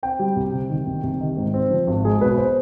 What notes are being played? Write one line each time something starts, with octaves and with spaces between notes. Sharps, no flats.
C4 G5
G3
C2
C3
D#3
C2
C2
D#3
G#2
C4
F3
G#1
G#3 G#4
B1 B4
C5